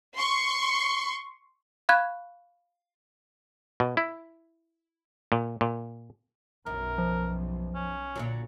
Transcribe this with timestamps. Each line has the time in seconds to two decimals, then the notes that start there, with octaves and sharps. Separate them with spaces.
0.16 C6 C#6
1.89 F5 B5 C#6 F#6 G#6
3.80 B2
3.97 E4
5.32 A#2
5.61 A#2
6.66 B1 F#2 A#4
6.98 F3
7.75 C#4
8.16 A#2 D3 F#3